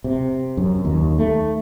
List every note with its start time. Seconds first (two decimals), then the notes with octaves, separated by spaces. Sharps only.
0.04 C3
0.57 F#2
0.85 D#2
1.18 A3